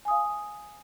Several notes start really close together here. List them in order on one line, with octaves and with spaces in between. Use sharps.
G#5 D#6 F5